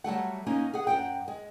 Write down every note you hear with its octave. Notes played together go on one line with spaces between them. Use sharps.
F#3 G3 A3 F#5
A#3 C#4 D#4
G#4 F#5
F#2 F#5 G5
G#3